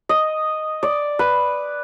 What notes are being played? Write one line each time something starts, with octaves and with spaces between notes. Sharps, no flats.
D#5
D5
B4